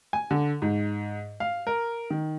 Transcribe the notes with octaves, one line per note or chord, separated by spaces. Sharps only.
G#5
D3
G#2
F5
A#4
D#3